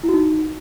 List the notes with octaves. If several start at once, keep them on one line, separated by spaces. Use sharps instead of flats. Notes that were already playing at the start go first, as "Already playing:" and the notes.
E4
F#4
D#4